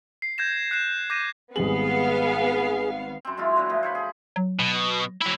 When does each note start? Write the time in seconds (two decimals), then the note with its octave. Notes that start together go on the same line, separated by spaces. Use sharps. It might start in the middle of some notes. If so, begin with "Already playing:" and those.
0.22 C7
0.38 G6 G#6 A#6 E7
0.71 F#6 C7 E7
1.10 D6 G6 A#6 D#7
1.56 G#1 G3 B3 G#4 F5 F#7
3.25 F#2 C4
3.37 F#2 G#3 E4 F4
3.56 D3 G#3 B3
3.69 F3 A3 B3
3.83 C5 C#5 B5
3.95 G#4
4.36 F#3
4.59 B2
5.22 F#3 E4